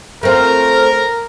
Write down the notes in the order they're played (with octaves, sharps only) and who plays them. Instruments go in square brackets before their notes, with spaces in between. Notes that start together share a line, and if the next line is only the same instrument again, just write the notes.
[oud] A3 C4 F4 [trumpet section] A#4